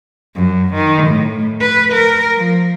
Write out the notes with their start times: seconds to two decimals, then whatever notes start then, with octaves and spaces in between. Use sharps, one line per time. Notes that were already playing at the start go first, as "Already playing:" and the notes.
0.35 F#2
0.74 D#3
1.07 A2
1.61 B4
1.93 A#4
2.36 F3